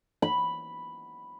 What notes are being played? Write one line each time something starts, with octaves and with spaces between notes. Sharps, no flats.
B5